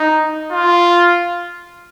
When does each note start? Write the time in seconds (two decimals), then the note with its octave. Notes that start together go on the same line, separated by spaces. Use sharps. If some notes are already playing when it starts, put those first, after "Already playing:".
Already playing: D#4
0.52 F4